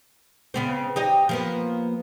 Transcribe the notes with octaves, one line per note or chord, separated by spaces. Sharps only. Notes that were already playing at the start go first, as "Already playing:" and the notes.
C#3 B3 C4
D#4 G4 D#5
F3 A#3 B3